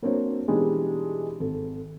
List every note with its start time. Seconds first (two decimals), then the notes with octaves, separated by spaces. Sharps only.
0.02 F#3 A#3 C4 D4 C5 C#5
0.48 B2 E3 G3 G#3 D4 D#4
1.40 G#1 A4